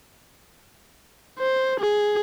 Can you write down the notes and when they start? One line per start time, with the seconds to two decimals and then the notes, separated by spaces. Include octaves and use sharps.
1.39 C5
1.80 G#4